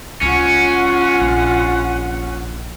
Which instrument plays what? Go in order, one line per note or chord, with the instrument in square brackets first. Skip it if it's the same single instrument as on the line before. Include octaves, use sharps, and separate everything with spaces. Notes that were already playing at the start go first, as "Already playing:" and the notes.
[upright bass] C#2 [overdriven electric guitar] C#4 [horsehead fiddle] F4 F#5
[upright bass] A#1